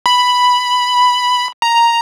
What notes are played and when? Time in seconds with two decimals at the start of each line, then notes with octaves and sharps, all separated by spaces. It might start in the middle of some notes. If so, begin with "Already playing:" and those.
0.06 B5
1.62 A#5